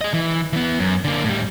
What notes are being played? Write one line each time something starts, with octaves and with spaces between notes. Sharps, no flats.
G#4 D#5
E3
E3 B3
F#2
D3 A#3
A2 G3